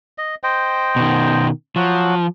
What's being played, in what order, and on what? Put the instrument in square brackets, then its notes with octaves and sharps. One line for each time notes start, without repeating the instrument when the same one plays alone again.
[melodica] D#5
C5 D#5 G5
[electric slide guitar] B2 D#3
[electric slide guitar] F3 [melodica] F#3 F#4